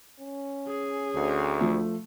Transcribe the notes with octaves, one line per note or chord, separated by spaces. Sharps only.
C#4
G#4
D2
F3 A3